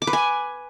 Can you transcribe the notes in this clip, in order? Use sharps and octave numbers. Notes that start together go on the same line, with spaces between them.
D6
B4
G#5